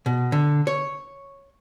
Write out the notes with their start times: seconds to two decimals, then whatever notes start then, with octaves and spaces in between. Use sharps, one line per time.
0.06 B2
0.32 D3
0.67 C#5